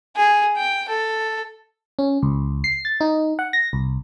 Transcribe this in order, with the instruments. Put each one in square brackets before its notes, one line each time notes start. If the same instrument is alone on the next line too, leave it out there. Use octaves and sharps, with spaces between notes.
[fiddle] G#4
G5
A4
[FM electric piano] C#4
C#2
C7
A6
D#4
F#5
A#6
C2